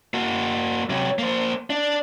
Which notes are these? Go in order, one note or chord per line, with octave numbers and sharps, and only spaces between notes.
A#3 F#4
C3 F#3
A#3 C5
D4